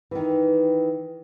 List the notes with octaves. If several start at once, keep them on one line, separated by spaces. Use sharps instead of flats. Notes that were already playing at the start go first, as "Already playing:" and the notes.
D#3 E3